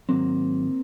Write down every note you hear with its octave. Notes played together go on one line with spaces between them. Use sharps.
G#2 D#3 F#3 A#3 C4